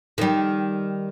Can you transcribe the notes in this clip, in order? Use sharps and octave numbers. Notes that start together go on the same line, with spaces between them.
D#3 G3